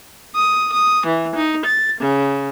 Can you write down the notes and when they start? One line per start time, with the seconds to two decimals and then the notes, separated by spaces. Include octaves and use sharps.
0.34 D#6
0.72 D#6
1.06 E3
1.35 D#4
1.65 A6
1.99 C#3